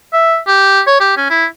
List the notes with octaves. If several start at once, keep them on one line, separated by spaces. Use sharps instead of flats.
E5
G4
C#5
G4
C#4
E4